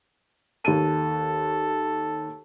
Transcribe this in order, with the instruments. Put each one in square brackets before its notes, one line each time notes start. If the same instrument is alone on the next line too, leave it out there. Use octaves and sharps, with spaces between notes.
[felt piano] D#2 D#7 [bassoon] A4